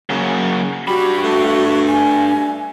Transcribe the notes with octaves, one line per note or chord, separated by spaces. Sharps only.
C#3 F#3 A#3
G2 G3 F#4 B5
A3
G#5